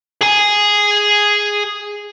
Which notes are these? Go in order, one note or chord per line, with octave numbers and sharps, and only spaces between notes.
G#4 G#5